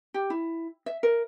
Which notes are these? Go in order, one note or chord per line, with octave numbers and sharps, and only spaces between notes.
G4
E4
E5
A#4